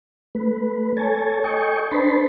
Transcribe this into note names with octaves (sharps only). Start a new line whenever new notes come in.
A3 B4
A4 C#5 G#5 A5
A4 D#5 G5 G#5 C#6
D4 B4 C5 A5 B5 C6